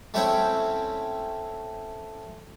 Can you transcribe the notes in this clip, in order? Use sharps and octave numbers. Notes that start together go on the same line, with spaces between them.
A3 C4 C#4 E4 G5